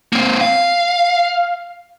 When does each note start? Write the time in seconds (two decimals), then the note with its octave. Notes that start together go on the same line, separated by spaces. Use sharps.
0.13 A#3 C4
0.41 F5